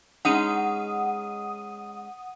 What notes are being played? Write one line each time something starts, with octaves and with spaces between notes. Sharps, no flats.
G#3 C#4 D#4 F#5 D#6 D#7